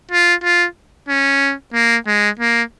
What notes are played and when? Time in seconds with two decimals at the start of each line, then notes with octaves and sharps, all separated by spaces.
0.11 F4
0.43 F4
1.08 C#4
1.74 A#3
2.06 G#3
2.39 A#3